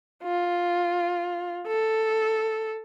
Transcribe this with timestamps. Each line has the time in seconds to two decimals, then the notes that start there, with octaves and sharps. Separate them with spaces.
0.23 F4
1.67 A4